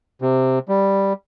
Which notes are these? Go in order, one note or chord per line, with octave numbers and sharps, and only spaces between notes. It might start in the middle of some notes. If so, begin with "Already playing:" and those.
C3
G3